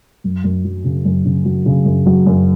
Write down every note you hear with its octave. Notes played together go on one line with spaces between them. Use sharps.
F#2
F#2
F#3
C#3
F#2
C#3
F#3
C#3
F#2
F#3
F#2